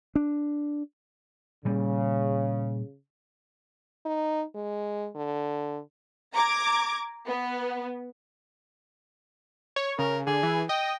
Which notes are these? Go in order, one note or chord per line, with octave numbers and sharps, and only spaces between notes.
D4
A#2 C#3 G3
D#4
G#3
D3
A#5 D6 G#6
B3
C#5
C#3 A#4
D3 G#4
E3
D#5 G5